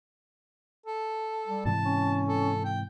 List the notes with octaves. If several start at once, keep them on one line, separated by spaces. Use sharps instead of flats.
A4
G3
G#2 C3 E3 A5
C#4
A4
G5